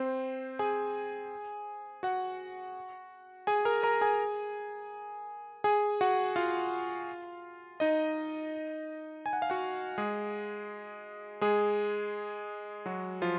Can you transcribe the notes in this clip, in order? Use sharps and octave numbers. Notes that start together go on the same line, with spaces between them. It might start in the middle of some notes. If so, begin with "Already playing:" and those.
Already playing: C4 C5
G#4 G#5
F#4 F#5
G#4 G#5
A#4 A#5
A#4 A#5
G#4 G#5
G#4 G#5
F#4 F#5
F4 F5
D#4 D#5
G#5
F#5
F5
F#4 F#5
G#3 G#4
G#3 G#4
F#3 F#4
F3 F4